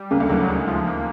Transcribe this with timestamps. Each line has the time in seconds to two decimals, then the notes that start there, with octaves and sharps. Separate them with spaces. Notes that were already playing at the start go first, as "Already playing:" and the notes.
Already playing: G3
0.11 C#2 C#3 A#3
0.20 D2 D3
0.30 D#2 D#3 F#3
0.49 G#3
0.68 F3
0.87 A#3